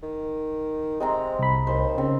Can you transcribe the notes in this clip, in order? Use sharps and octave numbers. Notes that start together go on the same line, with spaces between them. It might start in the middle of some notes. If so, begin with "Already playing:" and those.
D#3
C3 G#3 C4 A#5
C2 B5
D#2 C5
C#3 C4